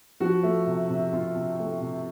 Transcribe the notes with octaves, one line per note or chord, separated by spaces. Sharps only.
F3 F#4
A3
C3
C3
C3 F4
C3
A3
C3